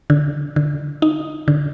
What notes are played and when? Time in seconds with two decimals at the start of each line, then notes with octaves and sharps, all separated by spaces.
0.10 D3
0.56 D3
1.02 D#4
1.48 D3